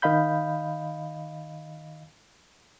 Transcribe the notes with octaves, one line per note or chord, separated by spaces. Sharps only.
D#3 D#5 F5 B5 G6